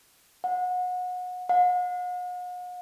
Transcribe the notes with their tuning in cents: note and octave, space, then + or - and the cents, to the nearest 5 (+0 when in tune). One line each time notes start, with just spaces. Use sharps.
F#5 -30
F#5 -45